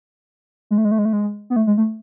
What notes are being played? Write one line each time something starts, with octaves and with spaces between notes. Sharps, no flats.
G#3
A3
G#3
A3
G#3
A3
G#3
B3
A3
G#3
A3